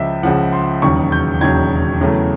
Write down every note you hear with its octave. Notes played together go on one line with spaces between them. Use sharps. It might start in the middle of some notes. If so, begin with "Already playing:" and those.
Already playing: C#2 C#3 F3 D#5 E5
C#2 C#3 F3 F#5
C6
E1 D#2 C#3 F#3 C#6
G6
E1 D#2 C#3 F#3 G#6
E2 C#3 F#3 A3